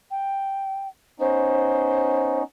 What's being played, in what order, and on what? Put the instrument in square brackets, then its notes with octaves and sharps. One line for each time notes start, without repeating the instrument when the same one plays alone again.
[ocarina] G5
[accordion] B3 C#4 D#4 [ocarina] C5